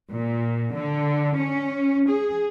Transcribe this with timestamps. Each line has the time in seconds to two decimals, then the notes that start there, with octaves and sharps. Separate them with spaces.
0.12 A#2
0.75 D3
1.38 C#4
2.10 G#4